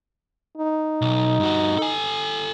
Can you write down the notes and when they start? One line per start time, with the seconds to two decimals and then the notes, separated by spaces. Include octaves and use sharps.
0.57 D#4
1.01 B1
1.40 G2 F#4
1.78 A4 G#5